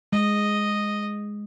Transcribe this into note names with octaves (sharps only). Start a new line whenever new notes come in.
G#3 D#5